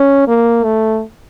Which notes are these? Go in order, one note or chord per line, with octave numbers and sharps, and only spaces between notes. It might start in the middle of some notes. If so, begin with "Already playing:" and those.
Already playing: C#4
A#3
A3